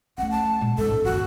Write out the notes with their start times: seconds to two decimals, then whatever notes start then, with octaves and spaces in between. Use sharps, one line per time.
0.18 A3 C#4 F#5
0.31 A5
0.61 A#2 G#3
0.78 A1 G#2 A4
1.05 F#1 D#2 F#4